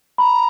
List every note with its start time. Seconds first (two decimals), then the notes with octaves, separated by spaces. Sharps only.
0.18 A#5 B5